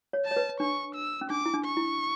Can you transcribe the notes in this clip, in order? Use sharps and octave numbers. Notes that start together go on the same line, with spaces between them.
C#5
A5
C#5
B4
D4 C#6
E6
C#4
D4 D6
E4
D4
C#6
E4